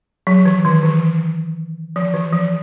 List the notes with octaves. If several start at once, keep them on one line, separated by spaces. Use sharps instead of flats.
F#3
E3
D#3
E3
F3
E3
F3